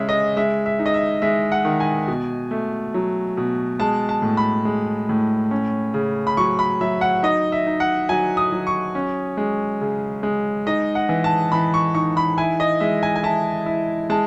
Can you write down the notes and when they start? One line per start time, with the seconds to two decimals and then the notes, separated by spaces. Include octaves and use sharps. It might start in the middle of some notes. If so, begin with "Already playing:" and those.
Already playing: C#3 G#3 C#4 E5
0.09 D#5
0.37 G#3 E5
0.66 E5
0.79 D#4
0.86 D#5
0.94 E5
1.22 G#3 E5
1.52 F#5
1.65 D#3
1.80 G#5
2.08 B2
2.51 A3
2.94 F#3
3.37 B2
3.80 G#3 A5
4.09 A5
4.22 A2
4.37 B5
4.65 G#3
5.09 A2
5.51 C#4
5.94 C#3
6.27 B5
6.37 F#3 C#6
6.59 B5
6.81 F#3 E5
7.01 F#5
7.23 D#4 D#5
7.52 E5
7.67 D#4
7.80 F#5
8.09 F#3 G#5
8.37 D#6
8.52 F#3
8.67 C#6
8.95 C#4
9.37 G#3
9.81 C#3
10.23 G#3
10.67 D#4 D#5
10.95 F#5
11.09 E3
11.24 A5
11.52 E3 B5
11.74 C#6
11.95 D#4 C#6
12.17 B5
12.37 E4 G#5
12.60 D#5
12.80 G#3 E5
13.03 G#5
13.16 G#5
13.23 E4 A5
13.66 E4
14.10 G#3 A5